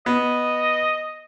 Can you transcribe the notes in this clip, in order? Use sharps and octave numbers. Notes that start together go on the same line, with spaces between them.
B3 D#5